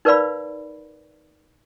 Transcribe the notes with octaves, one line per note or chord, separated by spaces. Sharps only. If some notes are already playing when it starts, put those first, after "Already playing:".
D#4 A#4 B4 D5 F5 B5